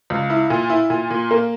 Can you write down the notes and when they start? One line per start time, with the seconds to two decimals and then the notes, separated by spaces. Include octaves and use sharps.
0.10 C#2
0.30 E4
0.50 A#2
0.70 E4
0.90 A#2
1.10 A#2
1.31 A#3